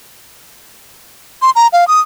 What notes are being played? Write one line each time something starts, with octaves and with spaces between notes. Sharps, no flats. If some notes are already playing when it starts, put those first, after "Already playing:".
C6
A#5
F5
D#6